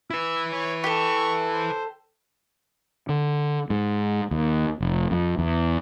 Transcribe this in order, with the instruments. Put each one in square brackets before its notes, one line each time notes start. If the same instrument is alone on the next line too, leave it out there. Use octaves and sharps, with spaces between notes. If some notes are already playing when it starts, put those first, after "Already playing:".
[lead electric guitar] E4 B4 [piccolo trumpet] E6
[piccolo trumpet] C#5
[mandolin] G4 A4 [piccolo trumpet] C#6
[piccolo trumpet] C5
[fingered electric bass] D3
G#2
D#2
F1
F2
E2